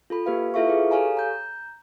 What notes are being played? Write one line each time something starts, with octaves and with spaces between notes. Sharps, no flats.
F4 A4 B5
A#3 G4 B4 F5
E4 F4 A4 E5 F5 C#6
G#4 B4
G4 A4 C#5 F5 G#5 A#5
A#5 G6